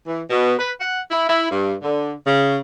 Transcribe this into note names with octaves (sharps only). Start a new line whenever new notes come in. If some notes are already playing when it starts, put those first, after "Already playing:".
E3
B2
B4
F#5
E4
E4
G2
D3
C#3